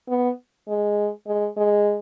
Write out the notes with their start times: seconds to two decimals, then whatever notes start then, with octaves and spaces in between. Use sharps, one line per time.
0.09 B3
0.68 G#3
1.27 G#3
1.57 G#3